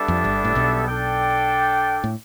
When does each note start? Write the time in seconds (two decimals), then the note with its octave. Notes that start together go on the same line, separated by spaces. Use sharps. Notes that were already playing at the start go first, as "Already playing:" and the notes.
Already playing: G3 B3 D4 A4 E5
0.08 F2 F3
0.24 G1 G2
0.44 A2
0.55 B1 B2
0.87 D4 A4 D5 G5
2.04 A2